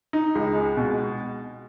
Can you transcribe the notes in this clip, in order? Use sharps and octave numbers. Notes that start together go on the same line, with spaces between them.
D#4
C#2
G#3
B2